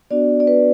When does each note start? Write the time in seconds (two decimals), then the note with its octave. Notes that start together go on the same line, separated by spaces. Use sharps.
0.11 B3 D4 F#4 D5
0.40 D5
0.47 B4